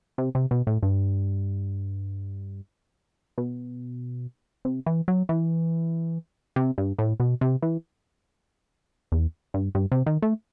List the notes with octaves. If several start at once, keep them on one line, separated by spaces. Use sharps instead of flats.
C3
C3
B2
A2
G2
B2
C3
E3
F#3
E3
C3
G2
A2
B2
C3
E3
E2
G2
G2
C3
D#3
A3